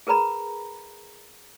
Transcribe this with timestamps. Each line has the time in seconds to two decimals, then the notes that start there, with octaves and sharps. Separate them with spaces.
0.07 G#4 A#4 B4 A#5 B5